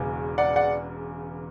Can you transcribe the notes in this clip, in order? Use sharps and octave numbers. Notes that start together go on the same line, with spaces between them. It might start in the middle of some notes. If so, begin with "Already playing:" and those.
Already playing: E1 E2 C#3
D5 F#5
D5 F#5